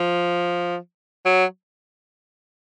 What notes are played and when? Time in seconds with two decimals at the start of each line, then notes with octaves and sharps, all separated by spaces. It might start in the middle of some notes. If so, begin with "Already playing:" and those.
Already playing: F3
1.26 F#3